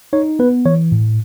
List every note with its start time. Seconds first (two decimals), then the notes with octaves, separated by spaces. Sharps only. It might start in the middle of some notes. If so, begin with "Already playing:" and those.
0.13 D#4 C#5
0.39 B3 B4
0.65 E3 C#5
0.92 A2